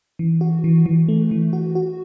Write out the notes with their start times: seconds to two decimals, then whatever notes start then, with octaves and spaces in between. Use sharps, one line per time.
0.19 E3
0.41 F#4
0.64 E3
0.86 E3
1.08 A3
1.31 E3
1.53 F#4
1.75 F#4